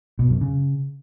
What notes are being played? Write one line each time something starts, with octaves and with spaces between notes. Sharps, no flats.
B2
F#2
C#3